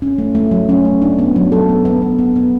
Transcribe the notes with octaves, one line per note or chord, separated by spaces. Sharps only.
C#4
A3
A3
F#3
C#4
A3
D4
B3
F#3
A4
B3
B3
B3
B3
B3